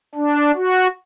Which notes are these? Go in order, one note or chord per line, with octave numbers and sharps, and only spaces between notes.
D4
F#4